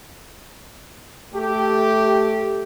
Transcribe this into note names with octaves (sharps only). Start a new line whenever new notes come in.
A3 G4